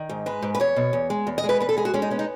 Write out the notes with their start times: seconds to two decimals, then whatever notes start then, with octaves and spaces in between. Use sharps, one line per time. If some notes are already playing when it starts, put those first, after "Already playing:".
Already playing: D#3
0.09 G#2
0.26 G#3 B4
0.42 G#2
0.55 B4
0.60 E2 C#5
0.76 B2
0.93 E2
1.10 G#3
1.27 E2
1.38 D#5
1.44 G#3
1.49 B4
1.60 E2 B4
1.69 A4
1.77 G#3 G#4
1.85 F#4
1.94 G#3 C#4
2.02 D#4
2.10 B3 C#4
2.19 D#4